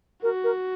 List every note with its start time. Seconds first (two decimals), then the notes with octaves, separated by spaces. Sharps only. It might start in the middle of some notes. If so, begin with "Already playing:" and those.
0.23 F#4 A#4
0.44 A#4